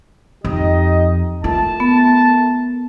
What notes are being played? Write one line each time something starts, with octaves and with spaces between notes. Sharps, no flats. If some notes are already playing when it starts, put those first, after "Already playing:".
F2 D#4 G4 D#5
A3 F4 A#4 A5
B3